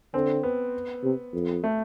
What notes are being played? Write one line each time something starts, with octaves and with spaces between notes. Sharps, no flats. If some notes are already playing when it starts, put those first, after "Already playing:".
D3 C4
B3
C3
F2
A3